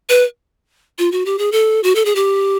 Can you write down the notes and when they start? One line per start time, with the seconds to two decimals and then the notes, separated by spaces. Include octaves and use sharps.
0.09 B4
0.98 F4
1.12 F#4
1.25 G4
1.38 G#4
1.52 A4
1.83 F#4
1.95 A4
2.05 G#4
2.15 G4